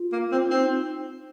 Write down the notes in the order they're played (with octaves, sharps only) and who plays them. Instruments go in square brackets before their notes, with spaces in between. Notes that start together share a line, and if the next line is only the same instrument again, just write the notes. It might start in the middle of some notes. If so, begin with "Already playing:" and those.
Already playing: [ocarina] F4
[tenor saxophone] A#3
C4
[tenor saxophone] C4 [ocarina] D#4